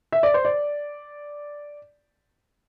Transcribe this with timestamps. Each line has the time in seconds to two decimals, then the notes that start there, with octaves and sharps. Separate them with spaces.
0.12 E5
0.23 D5
0.34 C5
0.45 D5